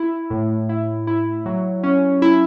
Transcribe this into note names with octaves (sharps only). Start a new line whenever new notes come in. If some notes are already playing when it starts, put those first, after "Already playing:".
Already playing: E4
A2
E4
E4
F#3
C#4
E4